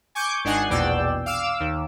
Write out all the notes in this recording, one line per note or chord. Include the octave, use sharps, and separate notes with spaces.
G#5 C#6 D6 G6
G#1 D4 D#4 F#5 G#5 C7
A#1 E2 B2 D5 G5 E6
F5 D6 E6
D#2